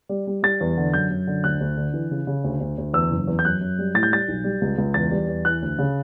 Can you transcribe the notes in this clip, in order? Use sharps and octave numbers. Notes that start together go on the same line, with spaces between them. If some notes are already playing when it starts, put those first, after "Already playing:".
G3
G3
G3 A6
E2
D3
F#2 G6
F#2
D3
D2 F#6
D2
D3
E3
C#3
C#3
D2
D2
D2
E2 E6
F#1
E2
G6
F#2 F#6
F#2
G3
A2 A6
G6
G3 A6
B1
G3
C#2
C#2
E2 A6
G3
E2
E3 F#6
D2
C#3